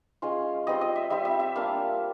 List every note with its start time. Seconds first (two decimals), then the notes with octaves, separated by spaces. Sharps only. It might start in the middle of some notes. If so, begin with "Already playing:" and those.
0.22 G#3 C#4 F4
0.67 G3 C4 F4 D#5
0.81 D#5
0.96 E5
1.10 G3 C4 F4 E5
1.25 E5
1.40 E5
1.55 G3 A#3 D4 F4 F5